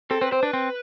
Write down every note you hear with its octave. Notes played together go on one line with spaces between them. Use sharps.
C4 A4
C4 B4
C4 C5
D4 B4
C4